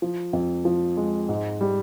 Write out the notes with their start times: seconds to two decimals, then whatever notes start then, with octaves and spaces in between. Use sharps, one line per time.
0.02 F3
0.33 F2
0.65 F3
0.97 G#3
1.29 G#2
1.61 G3